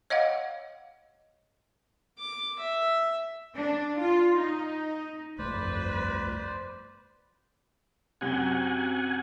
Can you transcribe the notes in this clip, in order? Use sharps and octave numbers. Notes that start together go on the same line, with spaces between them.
C#5 D#5 F5 F#5
D6
E5
D4
F4
D#4
G1 C2 F2 A3 B4 C5 D5
F#2 C3 F#3 F#5 G#5